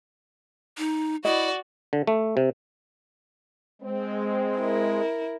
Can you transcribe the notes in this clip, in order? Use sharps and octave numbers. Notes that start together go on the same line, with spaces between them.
D#4
E4 F#4 D5 D#5
D3
A3
C3
G#3 C4
E4 A#4